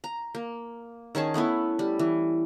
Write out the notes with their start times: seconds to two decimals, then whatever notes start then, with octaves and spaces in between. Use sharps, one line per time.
0.04 A#5
0.35 A#3
1.15 D#3 C#4 G#4 A5
1.34 A3 B3 C#4 E4
1.79 G3
1.99 E3